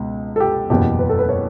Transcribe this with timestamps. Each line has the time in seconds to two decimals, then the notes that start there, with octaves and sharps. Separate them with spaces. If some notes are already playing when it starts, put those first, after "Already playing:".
Already playing: C#2 B2
0.36 A4
0.40 G4
0.70 F#1 E2 B2 G4
0.99 B4
1.09 A4
1.19 B4
1.29 C#5